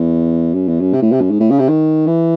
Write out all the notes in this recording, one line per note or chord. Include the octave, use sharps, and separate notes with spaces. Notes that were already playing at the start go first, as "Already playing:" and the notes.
Already playing: E2
F#2
E2
F#2
C3
A2
C3
F#2
G#2
A2
C#3
C3
D#3
E3